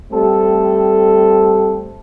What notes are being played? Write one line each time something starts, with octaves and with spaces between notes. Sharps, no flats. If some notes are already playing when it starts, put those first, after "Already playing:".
G3 A3 C4 A4